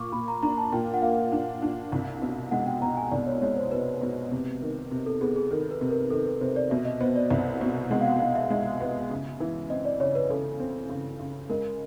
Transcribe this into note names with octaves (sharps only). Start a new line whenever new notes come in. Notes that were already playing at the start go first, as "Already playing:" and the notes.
Already playing: A#2 A#3 C#6 D6
A#2 B5
A#5
D4 A#5
A5
A#2 G5
F#5
A#3 F5
D4
D4
C2
B2
G#3 F#5
G5
B2 A#5
G#5
C2 D5
C#5
G#3 C#5
C5
B2 B4
B2
C3
D#3
C3
A4
B3 G#4
G#4
D#3 A4
B4
C3
A#4
D#3 A4
B4
C3 C5
D5
B2 E5
D#5
B3 C5
D5
C2 E5
B2
G#3 F#5
F5
F#5
B2 F5
E5
G#3 E5
B3
C#3
E3
C4 D#5
D5
C#3 C#5
B4
C#3 A4
C4
C#3
C#3
G#3 A#4